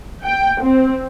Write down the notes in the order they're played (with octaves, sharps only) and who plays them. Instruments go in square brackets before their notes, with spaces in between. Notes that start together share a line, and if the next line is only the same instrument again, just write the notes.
[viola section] G5
C4